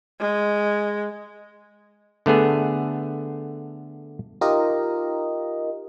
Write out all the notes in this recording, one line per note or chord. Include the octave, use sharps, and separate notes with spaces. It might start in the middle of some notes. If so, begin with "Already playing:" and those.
G#3
D3 A3 B3 G#4
D#4 F4 G4 A#4 D#5